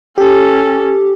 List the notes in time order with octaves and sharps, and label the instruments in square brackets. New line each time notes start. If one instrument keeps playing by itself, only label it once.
[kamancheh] C#4 A4 [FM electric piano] G4